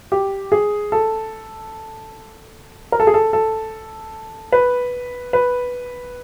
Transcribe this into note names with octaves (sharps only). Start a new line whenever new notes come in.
G4
G#4
A4
A#4
A4
G#4
A4
A4
B4
B4